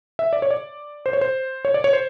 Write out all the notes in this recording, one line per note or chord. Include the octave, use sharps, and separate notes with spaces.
E5
D5
C#5
D5
C5
C#5
C5
C#5
D5
C#5
C5